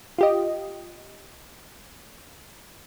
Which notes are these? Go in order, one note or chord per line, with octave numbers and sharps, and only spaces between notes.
F4 G4 D#5